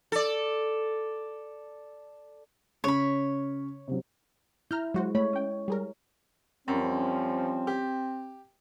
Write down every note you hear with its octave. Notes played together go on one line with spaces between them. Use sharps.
A4 D5
C#3 C#4 C#5 B5
C3 F#3
E4 A#5 F6 G6
F#3 G#3 F#4 C5
A3 C#5 B5
C#4 G5
G3 G#4 A#4
F#2 F3 G3 C4 C#4
G4